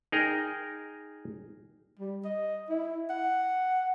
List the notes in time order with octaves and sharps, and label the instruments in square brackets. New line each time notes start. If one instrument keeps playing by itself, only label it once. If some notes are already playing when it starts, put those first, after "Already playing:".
[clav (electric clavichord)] D#4 G#4 A#4 D#5 G5
[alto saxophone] G3
D#5
E4
F#5